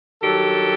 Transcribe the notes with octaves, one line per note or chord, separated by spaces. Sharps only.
G2 D#3 F#3 G4 A4